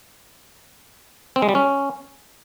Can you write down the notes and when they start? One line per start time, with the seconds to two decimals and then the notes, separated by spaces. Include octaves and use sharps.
1.36 C4
1.42 G#3
1.49 G3
1.55 C#4